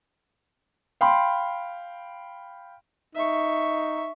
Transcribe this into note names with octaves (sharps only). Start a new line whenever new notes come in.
F5 G5 B5 C6
D#4 E5 C#6